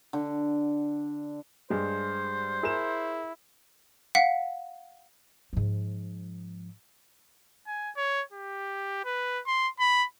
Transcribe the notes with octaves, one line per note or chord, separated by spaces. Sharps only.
D3
G2 G#3 C5
E4 G#4 A#4 E7
F5 F#5 B6
G#2 F3
G#5
C#5
G4
B4
C6
B5